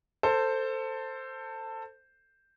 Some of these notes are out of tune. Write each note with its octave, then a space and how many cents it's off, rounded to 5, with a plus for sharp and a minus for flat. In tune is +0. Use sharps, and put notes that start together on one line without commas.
A4 +20 C5 +0